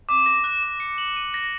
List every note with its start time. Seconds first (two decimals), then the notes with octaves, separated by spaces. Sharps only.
0.09 D6
0.26 A#6
0.44 F#6
0.63 D6
0.80 C#7
0.98 F#7
1.16 D#7
1.34 A#6